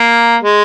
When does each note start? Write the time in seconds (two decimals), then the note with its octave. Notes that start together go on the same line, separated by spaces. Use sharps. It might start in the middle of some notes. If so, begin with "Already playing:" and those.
Already playing: A#3
0.43 G#3